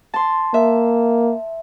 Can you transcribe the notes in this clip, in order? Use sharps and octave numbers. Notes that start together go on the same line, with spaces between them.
A5 C6
A#3 E5